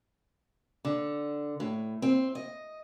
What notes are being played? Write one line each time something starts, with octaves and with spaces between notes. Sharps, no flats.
D3
A2
C4
D#5